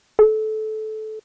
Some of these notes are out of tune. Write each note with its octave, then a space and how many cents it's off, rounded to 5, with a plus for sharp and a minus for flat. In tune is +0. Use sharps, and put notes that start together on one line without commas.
A4 -20